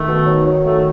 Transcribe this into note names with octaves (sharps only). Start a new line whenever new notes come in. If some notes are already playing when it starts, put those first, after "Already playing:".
Already playing: D#3 A3
B2
F#3
F#3
A3